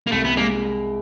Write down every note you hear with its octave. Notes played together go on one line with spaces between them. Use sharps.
A#3
C2 A3
B3
G#3 A#3